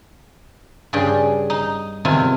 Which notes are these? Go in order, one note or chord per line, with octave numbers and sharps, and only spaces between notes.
G2 C#3 D4 G4 G#4 G5
D#4
E2 C3 D#3 E4 F4 G#5